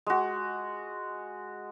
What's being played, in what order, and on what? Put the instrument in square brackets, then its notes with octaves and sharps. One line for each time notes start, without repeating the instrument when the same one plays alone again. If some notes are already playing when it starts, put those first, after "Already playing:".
[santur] G#3 F#4